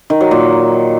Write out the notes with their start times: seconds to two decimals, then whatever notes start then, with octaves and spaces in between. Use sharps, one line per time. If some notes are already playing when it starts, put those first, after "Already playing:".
0.10 D#3
0.21 F#3
0.31 A#2